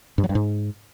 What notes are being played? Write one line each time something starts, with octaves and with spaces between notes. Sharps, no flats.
G2
F#3
G2
G#2